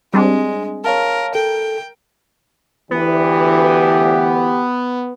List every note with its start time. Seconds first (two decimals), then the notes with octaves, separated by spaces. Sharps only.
0.14 G3 G#3 C4 D4
0.85 A#4 C#5 F5 A5
1.35 A4 G5
2.91 D2 E3 B3 G4